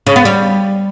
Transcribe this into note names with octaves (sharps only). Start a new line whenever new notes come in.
C#3
B3
G3